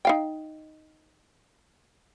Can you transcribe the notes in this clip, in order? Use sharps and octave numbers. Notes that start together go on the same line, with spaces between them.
D#4 F5 G5